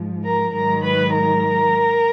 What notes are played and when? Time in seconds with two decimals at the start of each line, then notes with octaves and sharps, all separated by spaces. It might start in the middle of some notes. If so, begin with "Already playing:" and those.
Already playing: G#2 F3
0.23 A#4 A#5
0.53 G#2 D#3 F#3 A#4 A#5
0.83 B4 B5
1.14 A#4 A#5